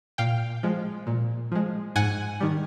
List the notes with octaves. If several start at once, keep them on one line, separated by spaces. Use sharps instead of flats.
A#2 F5 G5
F3 G#3
A#2
F3 G#3
G#2 F#5 G#5
D#3 G3